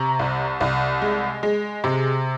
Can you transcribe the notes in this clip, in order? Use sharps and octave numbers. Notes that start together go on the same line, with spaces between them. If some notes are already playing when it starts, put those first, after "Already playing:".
Already playing: C3 A#5 C#6
C2
C2
G#3
G#3
C3